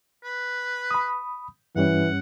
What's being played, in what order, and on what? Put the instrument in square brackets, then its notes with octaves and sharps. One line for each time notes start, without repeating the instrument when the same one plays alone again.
[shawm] B4
[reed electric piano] B5 D#6
[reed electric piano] G2 G3 C#4 [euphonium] E3 [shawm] F#5